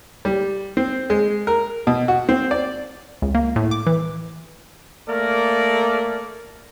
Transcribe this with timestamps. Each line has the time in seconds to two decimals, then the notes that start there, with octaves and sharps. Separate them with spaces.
0.25 G3
0.77 C4
1.10 G#3
1.47 A#4
1.87 B2
2.08 F#4
2.29 C4
2.51 D5
3.22 C#2
3.35 A#3
3.56 A2
3.71 D6
3.87 E3
5.09 A3 A#3 A#4 D5